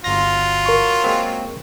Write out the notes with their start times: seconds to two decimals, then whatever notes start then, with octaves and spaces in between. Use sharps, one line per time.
0.04 G1 F#3 F4 A#6
0.66 A#4 C#6
1.04 G#3 A#3 C4